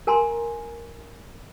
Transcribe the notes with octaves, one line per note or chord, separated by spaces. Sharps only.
A#4 G#5 A#5 C6